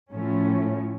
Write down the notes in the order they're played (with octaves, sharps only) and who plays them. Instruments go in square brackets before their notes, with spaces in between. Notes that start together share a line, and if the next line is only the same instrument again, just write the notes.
[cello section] A2 F3 A3 C#4